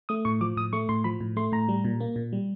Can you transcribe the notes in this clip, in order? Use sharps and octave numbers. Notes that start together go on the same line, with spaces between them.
A3 D#6
A2 C#6
F3 D6
A2 D#6
A3 C#6
A2 C6
F3 B5
A2
A3 C6
A2 A#5
G3
A#2
A#3
A#2
G3